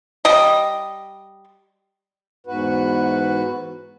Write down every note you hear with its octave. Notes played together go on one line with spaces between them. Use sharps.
G3 D#5
E2 G#2 F#4 B4